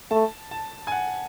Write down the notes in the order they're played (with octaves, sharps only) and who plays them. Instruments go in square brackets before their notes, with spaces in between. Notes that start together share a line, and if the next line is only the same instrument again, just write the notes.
[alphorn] A3 [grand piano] A5
[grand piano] A5
G#5
F#5